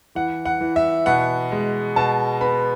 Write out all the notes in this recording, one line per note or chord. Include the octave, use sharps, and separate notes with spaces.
E3 F#5
F#5
E3
E5
B2 F#5
G#3
B2 A5
B3 B5